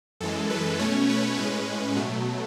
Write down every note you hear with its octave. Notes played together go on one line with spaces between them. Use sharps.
F#2 E3 G#3 A4
B4
B2 A3 C#4 C#5
B4
A2 G#3 C#4 B4
B2 F#3 A3